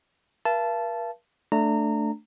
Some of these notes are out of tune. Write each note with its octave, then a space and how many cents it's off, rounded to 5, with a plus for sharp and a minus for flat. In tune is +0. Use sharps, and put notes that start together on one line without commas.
A#4 +45 F5 -45 A5 -10
A3 +0 D4 +0 A#5 -25